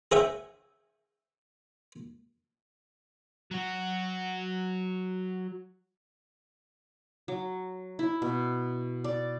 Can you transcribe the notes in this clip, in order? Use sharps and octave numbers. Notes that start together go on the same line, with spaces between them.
G#4 C#5 E5 F#5 G5
F#3 F#4
F#3
E4
B2
D5